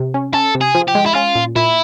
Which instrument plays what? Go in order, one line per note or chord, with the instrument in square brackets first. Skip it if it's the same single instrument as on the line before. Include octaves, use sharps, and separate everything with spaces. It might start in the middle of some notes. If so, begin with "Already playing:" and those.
Already playing: [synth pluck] C3
C#4
[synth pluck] C#4 [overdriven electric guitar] A4
[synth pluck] C3
[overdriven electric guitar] G#4
[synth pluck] F3
[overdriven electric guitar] G4
[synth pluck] G#3
[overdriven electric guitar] E4
[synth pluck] C#4 [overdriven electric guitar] F4
[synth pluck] A#2
[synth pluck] A#2 [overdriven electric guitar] E4